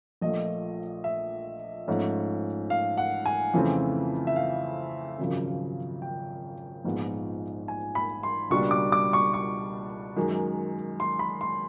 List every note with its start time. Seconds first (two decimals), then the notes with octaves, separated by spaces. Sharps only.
0.21 A#1 A#2 F3 A3 D#5
1.04 E5
1.88 G#2 F3 A3 C#4
2.70 F5
2.97 F#5
3.26 G#5
3.54 F2 C#3 E3 A3 C4
4.27 E5
4.36 F5
5.18 G#1 F#2 C#3 F3
6.02 G5
6.84 A#1 G#2 F3 G#3 B3
7.68 G#5
7.95 B5
8.23 C6
8.50 C#2 B2 G3 A#3 D4 C#6
8.71 D6
8.92 D6
9.13 C#6
9.34 C#6
10.16 F#2 D#3 G#3
11.00 C6
11.19 B5
11.41 C6